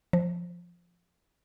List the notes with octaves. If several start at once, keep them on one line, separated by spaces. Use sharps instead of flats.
F3